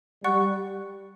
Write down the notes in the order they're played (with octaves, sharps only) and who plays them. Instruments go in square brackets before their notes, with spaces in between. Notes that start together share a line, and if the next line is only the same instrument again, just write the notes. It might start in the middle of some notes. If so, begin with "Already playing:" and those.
[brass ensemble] G3 [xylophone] D5 F#5 C#6 F#6